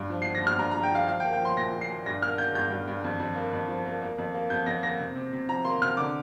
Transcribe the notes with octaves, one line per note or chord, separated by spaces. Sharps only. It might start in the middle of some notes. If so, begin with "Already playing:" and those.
Already playing: G2
F3
F3 C7
A#6
G2 F6
G2 A#5
F3 A#5
G5
F3 F5
F3 F5
G5
A#3
G5
F3
C6
A#2 A#6
F3
C7
A#2
G2 A#6
A#3 F6
A#3 G6
G2 G6
G2
G2
F2
F2
A#3
F2
F3
A#3
A#3
F2
A#3
F2 G6
F2 A#6
A#3 A#6
C3
C3
C3
F3 A#5
A#3 C6
C3 F6
D3 D6